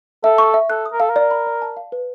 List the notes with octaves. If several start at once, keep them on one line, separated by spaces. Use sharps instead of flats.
A4 E5
C#6
E5
A4 F#6
D#6
A#4
A4 F5
A#4
D5
B5
D5
A5
F5
B4